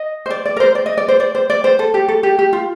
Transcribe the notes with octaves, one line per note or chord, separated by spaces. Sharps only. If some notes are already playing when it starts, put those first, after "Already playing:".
Already playing: D#5
C5
D5
D5
A#4
C5
D5
D#5
D5
C5
D5
C5
D5
C5
A4
G4
A4
G4
G4
F4